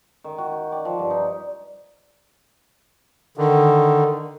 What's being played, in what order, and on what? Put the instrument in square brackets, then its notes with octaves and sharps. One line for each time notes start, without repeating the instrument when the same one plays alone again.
[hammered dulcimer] D#3
F#4
G5
D5
F3
G2
D#4
[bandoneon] D3 D#3